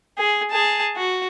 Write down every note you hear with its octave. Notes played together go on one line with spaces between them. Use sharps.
G#4
G#4 A5
F#4